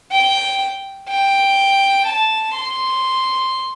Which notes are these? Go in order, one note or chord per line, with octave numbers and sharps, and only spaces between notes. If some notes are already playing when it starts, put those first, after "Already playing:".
G5
G5
A5
C6